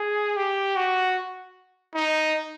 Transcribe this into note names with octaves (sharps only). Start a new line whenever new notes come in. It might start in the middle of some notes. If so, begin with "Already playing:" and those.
Already playing: G#4
G4
F#4
D#4